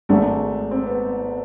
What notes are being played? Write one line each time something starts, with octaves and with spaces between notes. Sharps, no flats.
G#1 G#2 G#3 A3
C4
B3